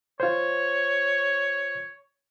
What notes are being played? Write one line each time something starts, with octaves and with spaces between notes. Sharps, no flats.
F4 C5 C#5